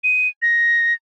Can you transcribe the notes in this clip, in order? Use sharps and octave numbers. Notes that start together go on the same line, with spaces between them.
D#7
A#6